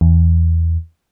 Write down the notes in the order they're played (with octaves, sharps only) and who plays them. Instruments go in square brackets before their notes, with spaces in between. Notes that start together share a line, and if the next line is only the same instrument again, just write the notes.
[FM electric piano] E2